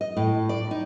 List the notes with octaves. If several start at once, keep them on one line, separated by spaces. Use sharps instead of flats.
D#5
A2
D5
D#4